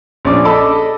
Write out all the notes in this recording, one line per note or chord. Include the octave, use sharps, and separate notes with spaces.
A#1 C#4 D4 D5 D6
A4 D#5 A5 B5 D6 E6